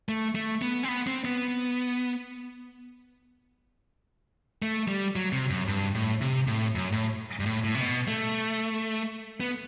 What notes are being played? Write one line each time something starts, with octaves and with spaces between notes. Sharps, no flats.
A3
A3
B3
C4
B3
C4
B3
A3
G3
F#3
C3
F#2
G2
A2
C3
A2
F#2
A2
G2
A2
A2
C3
B2
A3
B3